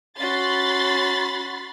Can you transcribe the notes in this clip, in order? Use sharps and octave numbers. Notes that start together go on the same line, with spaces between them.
C#4 F#4 B5 C6 A6